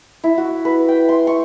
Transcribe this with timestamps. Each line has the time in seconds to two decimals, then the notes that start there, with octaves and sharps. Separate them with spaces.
0.24 E4
0.38 F#4
0.65 B4
0.88 G5
1.09 C6
1.27 C#6